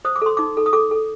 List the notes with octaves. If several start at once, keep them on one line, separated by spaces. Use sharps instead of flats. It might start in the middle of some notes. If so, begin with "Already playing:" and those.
C5 D#6
D6
A4 C6
D#4 D6
A4
D#6
A4 D6
A4